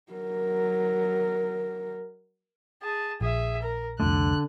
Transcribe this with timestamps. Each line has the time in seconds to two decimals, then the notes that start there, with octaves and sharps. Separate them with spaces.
0.12 F#3 A#4
2.83 G#4 A5
3.21 A#1 G#4 E5
3.61 A#4
4.00 C2 F2 D3 A3 F#6